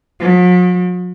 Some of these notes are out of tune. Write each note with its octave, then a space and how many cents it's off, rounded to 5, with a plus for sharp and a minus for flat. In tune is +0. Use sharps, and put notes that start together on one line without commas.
F#3 -45